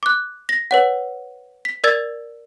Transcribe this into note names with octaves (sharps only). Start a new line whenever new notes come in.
D6 F#6
A#6
B4 C#5 F#5
B6
A#4 D5 E6 G#6 A6